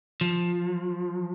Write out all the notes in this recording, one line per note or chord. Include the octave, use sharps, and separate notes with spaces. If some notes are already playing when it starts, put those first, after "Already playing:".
F3